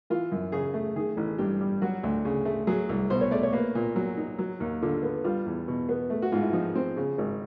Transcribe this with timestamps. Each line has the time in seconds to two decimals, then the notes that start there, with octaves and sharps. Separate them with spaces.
0.10 E3 F4
0.32 F#2
0.52 C#3 G#4
0.74 A3
0.96 D#3 G#4
1.17 A1
1.38 G2 G4
1.61 G3
1.82 F#3 F#4
2.03 D2
2.25 C#3
2.45 A3
2.67 F#3 G#4
2.89 C2
3.10 B2 C5
3.21 C#5
3.31 A3 D5
3.43 C#5
3.53 A#3 B4
3.75 A#2
3.96 F#3
4.17 D#4
4.39 F#3
4.60 D#2
4.82 D3 F4
5.03 B3
5.24 G3 F4
5.46 E2
5.68 B2
5.89 B3
6.10 A3
6.22 F#4
6.32 G#2 F4
6.42 E4
6.53 F3 D#4
6.75 C4
6.97 C#3
7.18 G#1